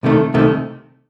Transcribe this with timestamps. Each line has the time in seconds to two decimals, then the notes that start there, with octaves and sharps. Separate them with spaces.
0.03 C2 C3 D#3 A3
0.34 C2 C3 D#3 A3